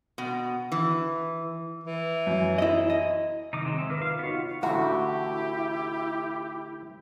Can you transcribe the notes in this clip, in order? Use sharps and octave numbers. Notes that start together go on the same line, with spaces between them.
B2
E3
E3
F#2
E4 D#5
D#5
C3 D#3 D#4 D6 D#6
F#3 G#3 C4
E5
D#3 B4 D6 F6
F4 F5
B3 D#4 F4 F#4 C#5
A1 D2 A3 E4 F#4 G4